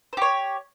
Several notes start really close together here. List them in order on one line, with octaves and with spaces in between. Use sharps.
C5 G4 C#5